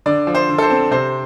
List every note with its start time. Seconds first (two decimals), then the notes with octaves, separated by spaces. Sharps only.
0.06 D3 D5
0.27 F3
0.35 C5
0.49 D3
0.58 A4
0.62 C5
0.70 C4
0.91 C3 C5